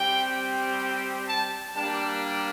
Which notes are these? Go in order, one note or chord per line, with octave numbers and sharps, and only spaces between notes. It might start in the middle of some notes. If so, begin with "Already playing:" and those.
Already playing: G3 C4 G4 G5
A5
G3 A#3 D4 G4 A5